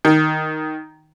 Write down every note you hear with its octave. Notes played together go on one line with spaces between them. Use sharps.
D#3